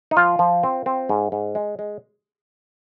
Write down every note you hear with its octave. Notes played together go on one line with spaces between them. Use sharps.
D#4
F3 F4
F3
C4
C4
G#2
G#2
G#3
G#3